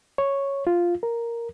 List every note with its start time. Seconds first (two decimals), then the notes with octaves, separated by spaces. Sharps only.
0.18 C#5
0.67 F4
1.03 A#4